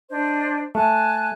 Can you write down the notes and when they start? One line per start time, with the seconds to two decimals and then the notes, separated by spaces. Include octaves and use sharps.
0.10 D4 C5 D#5
0.75 A3 G#5 A5 F#6